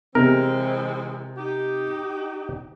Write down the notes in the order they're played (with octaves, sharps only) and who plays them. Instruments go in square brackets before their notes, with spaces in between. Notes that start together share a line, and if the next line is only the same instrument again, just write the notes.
[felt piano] C3 [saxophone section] E3 G#3 C4 [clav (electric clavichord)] A#4
[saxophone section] D#4 G4